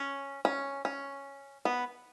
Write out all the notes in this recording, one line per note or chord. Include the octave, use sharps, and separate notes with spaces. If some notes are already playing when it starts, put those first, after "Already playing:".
Already playing: C#4
C#4
C#4
B3